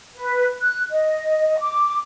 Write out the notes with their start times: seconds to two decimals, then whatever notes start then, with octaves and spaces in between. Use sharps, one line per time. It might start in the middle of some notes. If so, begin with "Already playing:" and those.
0.13 B4
0.59 F#6
0.89 D#5
1.58 D6